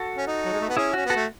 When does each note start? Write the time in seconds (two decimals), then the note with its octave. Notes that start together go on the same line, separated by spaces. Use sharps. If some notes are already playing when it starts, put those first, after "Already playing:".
Already playing: F#4 A4
0.17 C#4
0.27 D#4
0.45 F#3
0.53 G#3
0.60 A3
0.69 B3
0.77 C#4 E4 G#4
0.93 C#4 F#4
1.06 B3 F#4 A4
1.16 A3